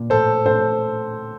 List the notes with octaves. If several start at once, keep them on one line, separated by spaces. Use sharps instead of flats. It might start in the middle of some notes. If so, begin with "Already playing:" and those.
Already playing: A#2
A2 A4 C5
A2 A4 C5